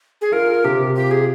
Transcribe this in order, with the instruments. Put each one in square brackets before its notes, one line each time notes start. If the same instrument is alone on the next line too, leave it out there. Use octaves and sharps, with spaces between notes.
[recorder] G#4
[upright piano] F4 [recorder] A#4
[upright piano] C3 [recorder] G4
[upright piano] F4 [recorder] G4
[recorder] G#4